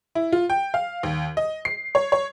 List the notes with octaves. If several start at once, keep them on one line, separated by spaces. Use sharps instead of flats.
E4
F4
G5
F5
D#2
D#5
C7
C#5
C#5